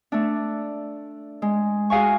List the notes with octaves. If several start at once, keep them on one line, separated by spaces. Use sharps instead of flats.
A3 D4
G#3
F#4 G#4 F5 G#5 C#6